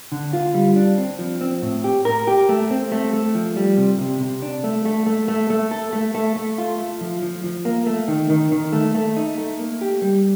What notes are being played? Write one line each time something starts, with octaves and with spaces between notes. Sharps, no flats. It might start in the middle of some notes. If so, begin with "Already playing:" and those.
D3
F4
G3
D4
C4
F3
C4
A2
G4
A#4
G4
A3
C4
A3
A3
F3
G3
C3
C3
C3
D4
A3
A3
A3
A3
A3
A4
A3
A3
A3
F4
A3
F3
F3
F3
A#3
A3
D#3
D#3
D#3
A3
A3
D#4
A3
A#3
G4
G3